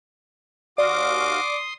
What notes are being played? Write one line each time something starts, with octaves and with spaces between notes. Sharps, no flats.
D#2 F#4 D5 F5 C6 D6 D#6